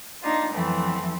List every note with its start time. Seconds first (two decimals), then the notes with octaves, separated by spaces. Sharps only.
0.22 A#3 D4 D#4 F4
0.54 F2 E3 F#3 A3 B3 C4